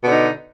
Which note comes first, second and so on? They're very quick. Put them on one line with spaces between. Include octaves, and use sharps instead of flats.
B2 D3 D#4